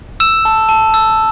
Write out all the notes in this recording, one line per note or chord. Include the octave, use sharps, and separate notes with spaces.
E6 E7
A5
A5
E6